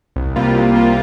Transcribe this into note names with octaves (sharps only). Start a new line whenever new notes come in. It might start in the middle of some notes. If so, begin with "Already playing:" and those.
C2
C3 G3 A#3 F4
C2
C3 G3 A#3 F4